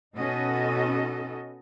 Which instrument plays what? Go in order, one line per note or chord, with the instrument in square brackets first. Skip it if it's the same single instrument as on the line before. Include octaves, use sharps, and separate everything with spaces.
[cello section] B2 C#4 D#4 F#4 A4 D#5